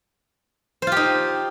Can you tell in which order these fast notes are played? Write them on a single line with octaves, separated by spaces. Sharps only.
C5 F4 G4 D#4